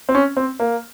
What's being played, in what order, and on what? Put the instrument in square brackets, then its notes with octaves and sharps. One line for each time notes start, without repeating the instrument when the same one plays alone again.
[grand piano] C4
C#4
C4
A#3